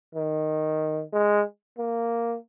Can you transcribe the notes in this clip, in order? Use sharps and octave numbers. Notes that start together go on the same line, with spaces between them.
D#3
G#3
A#3